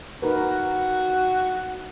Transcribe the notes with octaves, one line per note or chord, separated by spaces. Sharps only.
D#4 F#4 A#4 B4